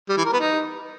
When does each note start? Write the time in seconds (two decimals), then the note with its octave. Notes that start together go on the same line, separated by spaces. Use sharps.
0.09 G3
0.17 E3
0.25 A#4
0.33 B3
0.40 D#4